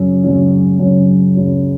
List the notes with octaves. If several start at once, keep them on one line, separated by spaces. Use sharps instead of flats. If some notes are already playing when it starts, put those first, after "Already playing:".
Already playing: F#2 C#3 F#3 C#4
F#2 C#3 F#3 C#4
F#2 C#3 F#3 C#4
F#2 C#3 F#3 C#4